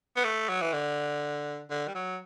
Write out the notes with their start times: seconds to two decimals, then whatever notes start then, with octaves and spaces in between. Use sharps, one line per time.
0.16 B3
0.25 A3
0.49 F#3
0.61 E3
0.73 D3
1.70 D3
1.88 G3
1.95 F#3